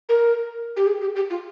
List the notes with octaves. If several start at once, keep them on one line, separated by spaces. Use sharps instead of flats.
A#4
G4
G#4
G4
G4
F4